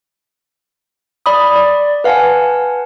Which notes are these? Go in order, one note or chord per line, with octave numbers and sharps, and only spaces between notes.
D5 B5 D#6
D5
B4 F5 F#5 G#5 A5